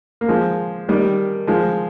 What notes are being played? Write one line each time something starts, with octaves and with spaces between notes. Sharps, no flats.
A#3
F3 G#3
D#3 G3
F3 G#3